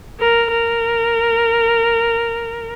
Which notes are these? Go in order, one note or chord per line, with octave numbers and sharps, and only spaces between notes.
A#4
A#4